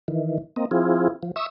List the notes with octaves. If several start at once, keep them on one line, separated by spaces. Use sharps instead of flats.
D#3 E3
A#3 C4 D#5
F3 C4 E4 F4 G#4
F3
E5 C#6 D#6 E6